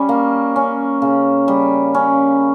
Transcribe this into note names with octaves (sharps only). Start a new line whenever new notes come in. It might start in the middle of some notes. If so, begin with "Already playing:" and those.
Already playing: G3 C#4
A#3
C#4
C#3
G3
C#4